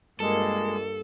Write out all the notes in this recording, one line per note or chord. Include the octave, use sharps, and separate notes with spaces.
G2 G#3 A#3 F4 A4 A#4 D#5